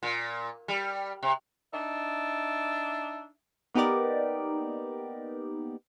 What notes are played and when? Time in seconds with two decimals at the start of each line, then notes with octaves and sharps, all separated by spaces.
0.03 A#2
0.68 G3
1.23 C3
1.73 D4 D#4 E5
3.74 A#3 B3 D#4 G4 A#4 D5